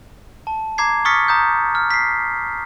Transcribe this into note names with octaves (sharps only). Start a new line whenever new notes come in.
A5
A#5 D6 G#6 C7
C#6 D#6 F6 A6 B6 C#7
A#5 D#6 G6
F6
B6 C7